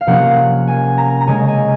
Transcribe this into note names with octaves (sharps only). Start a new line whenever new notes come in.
F5
C3 F3 A#3 C#4 F#5
G#5
A#5
A#5
C#3 G#3 C#4 G#5
G#5